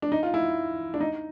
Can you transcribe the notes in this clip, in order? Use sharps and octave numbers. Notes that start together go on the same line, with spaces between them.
D4
D#4
F4
E4
D4
D#4